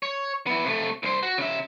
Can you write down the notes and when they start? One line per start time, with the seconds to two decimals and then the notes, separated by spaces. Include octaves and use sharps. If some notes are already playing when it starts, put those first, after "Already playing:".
0.03 C#5
0.47 B3 E4
0.65 C3 A3
1.03 C2 C5
1.23 F#4
1.38 C#3 E5